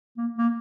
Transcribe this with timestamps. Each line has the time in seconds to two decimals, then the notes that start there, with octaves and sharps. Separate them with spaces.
0.17 A#3
0.38 A#3